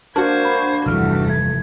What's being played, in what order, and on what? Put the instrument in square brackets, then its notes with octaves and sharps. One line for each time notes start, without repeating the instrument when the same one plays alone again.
[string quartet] A#3 C5 G#6 [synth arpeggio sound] D4 F#4 [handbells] A#4
[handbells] B5
[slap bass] F1 E3 F3 [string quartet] E2 G2 A3 [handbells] E6 F6
[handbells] G#6